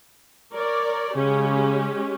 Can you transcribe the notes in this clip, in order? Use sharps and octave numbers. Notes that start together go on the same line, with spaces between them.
A#4 C#5 D5
C#3 G#3 C#4 G4